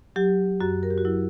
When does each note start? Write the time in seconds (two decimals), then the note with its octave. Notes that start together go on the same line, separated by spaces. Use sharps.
0.16 F#3 G4
0.61 F#2 F#4
0.83 A#4
0.91 G4
0.98 F#4
1.05 F#3 E4